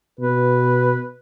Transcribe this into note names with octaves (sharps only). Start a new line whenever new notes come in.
B2 B4